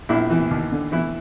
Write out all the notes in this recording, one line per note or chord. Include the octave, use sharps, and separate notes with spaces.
A#1 E4
E3
D#2
D3
E3 E4